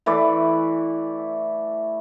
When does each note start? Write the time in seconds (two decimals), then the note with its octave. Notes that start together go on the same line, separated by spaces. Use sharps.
0.06 E3 A3 B4 D5